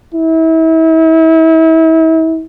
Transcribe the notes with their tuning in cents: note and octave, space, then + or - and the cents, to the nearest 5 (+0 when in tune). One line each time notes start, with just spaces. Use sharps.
E4 -35